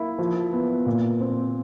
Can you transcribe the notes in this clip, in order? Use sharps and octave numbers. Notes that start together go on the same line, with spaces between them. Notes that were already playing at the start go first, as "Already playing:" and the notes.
Already playing: A#3 E4
F3
B3
A#2
C4